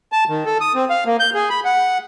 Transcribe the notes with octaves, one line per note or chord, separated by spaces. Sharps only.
A5
D#3
A4
D#6
C4
F5
A#3
G6
G#4
B5
F#5